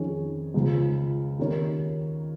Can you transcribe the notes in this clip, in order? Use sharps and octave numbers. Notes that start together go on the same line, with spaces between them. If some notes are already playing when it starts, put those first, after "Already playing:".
Already playing: F2 D#3 C#4 G#4
C#2 C#3 F3
D#2 D#3 C#4 A#4 C#5